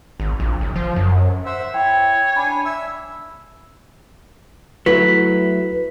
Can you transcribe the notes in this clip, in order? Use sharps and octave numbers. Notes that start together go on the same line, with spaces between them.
G#1
A#1
F#1
F3
F#2
C5 E5 F#5
E4 C#5 G5
D4 G#5 B5
E5 E6
F#3 A3 E4 B4 B6